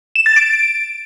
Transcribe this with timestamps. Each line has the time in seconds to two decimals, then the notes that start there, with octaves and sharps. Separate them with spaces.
0.16 E7
0.26 A6
0.36 D7